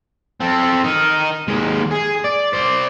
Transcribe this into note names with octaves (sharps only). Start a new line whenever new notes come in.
C4 A4
D#4 A#4
D#2 G#3
G#4
D5
C5 D5